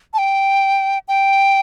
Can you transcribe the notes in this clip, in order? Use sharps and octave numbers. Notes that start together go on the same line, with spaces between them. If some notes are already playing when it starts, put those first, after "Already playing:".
A5
G5
G5